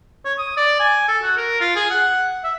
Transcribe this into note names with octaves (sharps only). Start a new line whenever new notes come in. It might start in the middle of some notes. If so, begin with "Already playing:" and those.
C#5
D#6
D5
G#5
A4
F#4
A#4
F4
G#4
F#5
E5